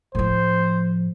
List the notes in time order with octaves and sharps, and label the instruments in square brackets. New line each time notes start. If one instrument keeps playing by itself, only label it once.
[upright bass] A2 F3 [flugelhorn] C5